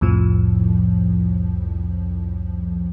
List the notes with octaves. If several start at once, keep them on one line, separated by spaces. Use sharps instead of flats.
C2 F2 A2 F3